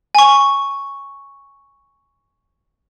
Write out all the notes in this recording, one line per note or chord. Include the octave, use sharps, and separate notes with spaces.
G#5 C#6